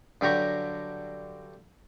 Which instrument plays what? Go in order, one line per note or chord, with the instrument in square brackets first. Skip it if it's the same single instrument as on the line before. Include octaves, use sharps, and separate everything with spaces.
[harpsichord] G2 D3 F#3 G4 A#5 C#6